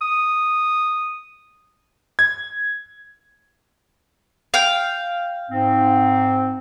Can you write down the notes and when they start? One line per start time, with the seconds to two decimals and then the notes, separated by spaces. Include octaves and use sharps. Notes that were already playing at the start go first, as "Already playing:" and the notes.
0.01 D#6
2.19 G#6
4.54 F5 G5
5.50 G#2 C4